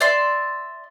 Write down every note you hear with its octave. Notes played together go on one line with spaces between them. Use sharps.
D5 E5 C6